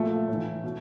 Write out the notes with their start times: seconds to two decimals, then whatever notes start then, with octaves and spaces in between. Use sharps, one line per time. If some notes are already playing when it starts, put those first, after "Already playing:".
Already playing: A#2 F3 A3
0.28 A2
0.33 E3
0.64 B2